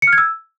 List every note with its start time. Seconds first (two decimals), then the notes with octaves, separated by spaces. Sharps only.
0.02 C#7
0.07 F6
0.13 G#6
0.18 E6